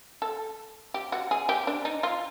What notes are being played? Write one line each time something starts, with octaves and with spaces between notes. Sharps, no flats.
A4
G4
F#4
G#4
G4
D4
D#4
F4